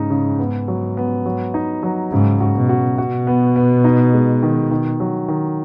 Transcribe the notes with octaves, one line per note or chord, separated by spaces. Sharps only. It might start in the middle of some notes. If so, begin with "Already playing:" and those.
Already playing: G#2 C#3 G#3 D#4
C#3
B3
F#3
B3
F#3
D#4
F#3
G#2 C#3
F#4
B2
F#4
B2 F#4
B3
B3
D#4
G#3
D#3
D#3
F#3
D#3